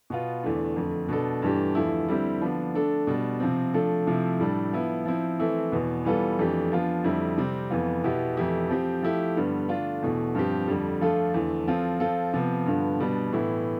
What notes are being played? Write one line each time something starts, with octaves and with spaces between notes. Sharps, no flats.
B2 B3 F4
E2 D3 A3 D4
F2 D3 A3
B2 B3 D4 A4
G2 E3 A3 D4 G4
E2 D3 F3 A3 E4
D3 G3 C4 E4 G4
D3 F3 B3 D4
D3 A3 D4 A4
B2 G3 D4
C3 F3 C4
F3 A3 D4 A4
C3 F3 A3 E4
A2 G3 D4 A4
F3 B3 E4
F3 C4 E4
E3 A3 C4 E4
E2 B2 B3
E3 G3 B3 F4 A4
F2 E3 A3 D4 G4
F3 B3 D4 F4
F2 D3 G3 C4 E4
C3 G3 C4
F2 E3 B3 F4
B2 B3 E4 G4
F2 E3 A3 E4 G4
F3 C4 G4
F3 A3 E4 G4
G2 D3 G3 B3
D3 A3 D4 F4
E2 B2 A3
G2 F3 C4 G4
F2 D3 G3
F3 A3 D4 F4 A4
E2 D3 A3
F3 C4 F4 A4
F3 C4 F4 A4
C3 F3 B3
G2 D3 F3 B3
B2 G3 B3 D4
A2 E3 B3 E4